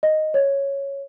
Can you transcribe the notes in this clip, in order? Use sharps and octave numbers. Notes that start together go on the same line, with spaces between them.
D#5
C#5